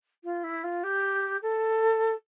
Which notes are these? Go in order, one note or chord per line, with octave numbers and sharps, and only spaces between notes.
F4
E4
F4
G4
A4